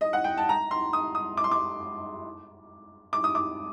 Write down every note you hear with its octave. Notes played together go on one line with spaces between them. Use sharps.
D#5
F#5
G5
A5
A#5
C6
D#6
D#6
D6
C6
D6
D6
D#6
D6